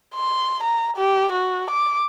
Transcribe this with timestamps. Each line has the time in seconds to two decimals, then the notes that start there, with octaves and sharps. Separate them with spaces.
0.15 C6
0.63 A#5
0.96 G4
1.32 F#4
1.70 D6